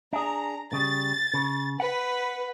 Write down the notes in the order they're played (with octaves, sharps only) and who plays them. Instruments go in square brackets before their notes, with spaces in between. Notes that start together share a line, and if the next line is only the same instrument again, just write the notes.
[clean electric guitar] D4 G#4 [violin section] A#5
[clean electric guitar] C#3 G3 [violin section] A6
[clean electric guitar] C#3
[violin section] B4 [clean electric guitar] F#5